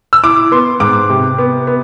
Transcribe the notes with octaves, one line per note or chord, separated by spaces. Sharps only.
E6
E4 D6
B3 C6
G#2 D6
C3
B3
B3